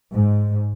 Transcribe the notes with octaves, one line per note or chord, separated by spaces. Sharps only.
G#2